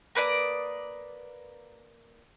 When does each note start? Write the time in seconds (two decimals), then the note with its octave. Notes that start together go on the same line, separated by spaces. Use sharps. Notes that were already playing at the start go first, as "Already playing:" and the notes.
0.15 A#3 B4 D5 D#6